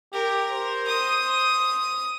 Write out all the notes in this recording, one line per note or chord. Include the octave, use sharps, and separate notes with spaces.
G4 A#4
C5
D#6